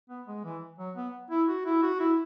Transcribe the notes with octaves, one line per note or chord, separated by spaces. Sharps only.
B3
G#3
E3
F#3
B3
E4
F#4
E4
F#4
E4